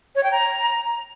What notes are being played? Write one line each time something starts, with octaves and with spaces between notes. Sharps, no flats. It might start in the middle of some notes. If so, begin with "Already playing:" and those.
C#5
G5
A#5